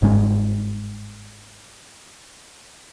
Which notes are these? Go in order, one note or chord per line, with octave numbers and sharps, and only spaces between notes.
G1 G#2 G#3 C#4